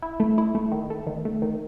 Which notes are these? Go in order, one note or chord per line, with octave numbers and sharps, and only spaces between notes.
E4
A3
E4
A3
D#3
A3
D#3
A3
D#3